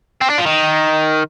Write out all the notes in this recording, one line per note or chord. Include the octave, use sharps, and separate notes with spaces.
C4
D4
F3
D#3